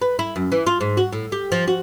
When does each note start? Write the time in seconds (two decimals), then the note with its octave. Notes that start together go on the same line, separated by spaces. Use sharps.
0.02 B4
0.19 E4
0.36 F#2
0.52 E3
0.67 F4
0.81 G#2
0.97 F#4
1.13 A2
1.32 G4
1.52 F3
1.68 F#4